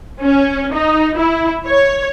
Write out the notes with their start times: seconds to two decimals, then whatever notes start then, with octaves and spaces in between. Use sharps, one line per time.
0.21 C#4
0.73 D#4
1.17 E4
1.66 C#5